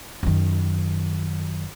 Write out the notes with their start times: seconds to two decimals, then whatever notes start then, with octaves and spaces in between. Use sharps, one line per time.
0.23 F#2 D#3